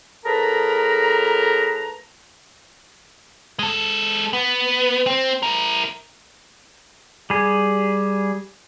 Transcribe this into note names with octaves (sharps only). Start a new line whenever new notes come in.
A2 G#4 A#4 B4 A5 A#5
G#3 A4
B3
C4
E4 A#4
G3 G#4